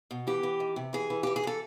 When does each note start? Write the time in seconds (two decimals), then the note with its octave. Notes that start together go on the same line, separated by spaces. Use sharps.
0.11 B2
0.27 E3 G4
0.43 E3
0.60 D#3
0.76 C3
0.93 E3 G#4
1.10 E3
1.23 E3 G4
1.36 G#4
1.43 E3 A4